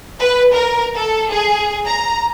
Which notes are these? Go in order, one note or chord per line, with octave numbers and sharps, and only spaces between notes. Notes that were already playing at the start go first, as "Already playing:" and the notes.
B4
A#4
A4
G#4
A#5